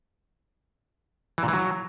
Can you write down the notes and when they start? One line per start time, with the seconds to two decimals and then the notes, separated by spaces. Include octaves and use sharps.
1.38 E3
1.43 A#2
1.48 E3
1.53 F#3